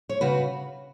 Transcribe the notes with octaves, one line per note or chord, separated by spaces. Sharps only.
C#5
C#3 F#4 B4